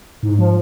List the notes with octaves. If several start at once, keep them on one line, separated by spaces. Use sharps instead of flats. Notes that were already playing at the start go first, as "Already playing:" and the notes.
G#2
F3